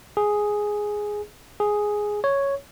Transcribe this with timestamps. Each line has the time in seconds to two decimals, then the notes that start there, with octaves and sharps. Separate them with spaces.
0.17 G#4
1.60 G#4
2.24 C#5